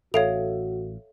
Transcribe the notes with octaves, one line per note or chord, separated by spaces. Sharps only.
A1 F#4 A4 C#5 E5 F5 G#5 F7